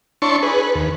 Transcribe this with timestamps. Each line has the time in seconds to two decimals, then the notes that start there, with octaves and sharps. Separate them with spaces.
0.22 D4 E4 C#5 A5 C6 C#6
0.42 G#4 B4
0.62 B4
0.75 D#2